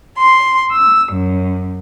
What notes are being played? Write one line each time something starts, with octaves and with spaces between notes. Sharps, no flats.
C6
E6
F#2